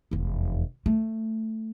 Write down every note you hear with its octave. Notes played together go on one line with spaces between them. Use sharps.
F1 E2
A3